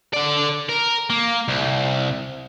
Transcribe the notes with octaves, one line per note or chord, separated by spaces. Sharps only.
D3 D5
A#4
A#3
C2